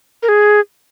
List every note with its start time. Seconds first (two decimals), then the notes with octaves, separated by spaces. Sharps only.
0.23 A#4
0.29 G#4